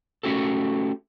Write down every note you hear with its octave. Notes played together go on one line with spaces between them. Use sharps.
A3 C#4 F#4 G4 A4